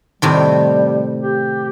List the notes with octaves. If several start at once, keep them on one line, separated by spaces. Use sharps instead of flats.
A2 C3 D#3 G3
G4